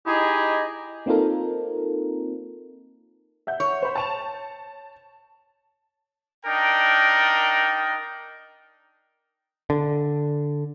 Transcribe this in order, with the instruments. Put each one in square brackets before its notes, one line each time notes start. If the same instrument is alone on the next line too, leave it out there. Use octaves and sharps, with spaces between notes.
[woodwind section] D#4 E4 G4 G#4 D#5
[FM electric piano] A#3 C4 D#4 F4 A4 A#4
[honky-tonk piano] E5 F#5 G6
[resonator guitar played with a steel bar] C#5
[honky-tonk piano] C5 B5
A5 E7 F7
[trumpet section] D4 D#4 A#4 G5
[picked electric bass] D3